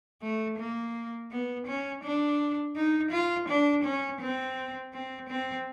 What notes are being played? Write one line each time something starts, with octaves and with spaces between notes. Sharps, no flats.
A3
A#3
B3
C#4
D4
D#4
F4
D4
C#4
C4
C4
C4